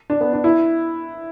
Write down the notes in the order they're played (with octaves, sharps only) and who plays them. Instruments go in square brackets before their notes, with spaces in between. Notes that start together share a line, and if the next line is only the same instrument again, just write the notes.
[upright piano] D4
B3
D4
E4